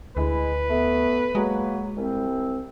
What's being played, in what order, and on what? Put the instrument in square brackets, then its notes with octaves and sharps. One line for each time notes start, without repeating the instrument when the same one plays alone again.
[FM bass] D2 [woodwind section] G#3 E4 [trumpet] B4
[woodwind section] A3 B3
[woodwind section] F#3 A#3 [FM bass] G#3
[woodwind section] C2 C4